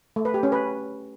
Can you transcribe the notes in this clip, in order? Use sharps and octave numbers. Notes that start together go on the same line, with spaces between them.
A3
B4
G4
C#4
B4